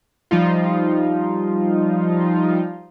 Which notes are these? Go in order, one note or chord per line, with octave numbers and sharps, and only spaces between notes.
F3 G3 D#4 F4